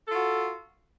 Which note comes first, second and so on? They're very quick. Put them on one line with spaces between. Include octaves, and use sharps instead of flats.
A4 F4 F#4